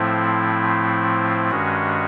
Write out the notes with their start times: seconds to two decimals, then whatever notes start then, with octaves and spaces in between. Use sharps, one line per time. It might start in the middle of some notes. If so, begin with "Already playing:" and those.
Already playing: A2 F3 A3 C4 E4
1.50 G2 D#3 G#3 C#4 F#4